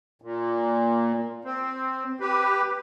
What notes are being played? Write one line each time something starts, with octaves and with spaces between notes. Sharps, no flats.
A#2
C4
G4 B4